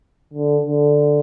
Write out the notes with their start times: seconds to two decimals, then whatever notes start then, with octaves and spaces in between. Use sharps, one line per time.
0.33 D3
0.66 D3